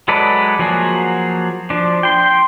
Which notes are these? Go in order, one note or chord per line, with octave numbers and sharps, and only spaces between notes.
F#3 G#3 A4 B4 D5
F3 F#3 A#3 F#4 G#4
F3 D4
G5 C6